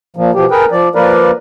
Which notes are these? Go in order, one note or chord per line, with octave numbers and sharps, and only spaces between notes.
A#2 F3
B2 F3 G4
G#4 A#4 B4 G5
F3 D5
F3 A#3 A#4 B4 D5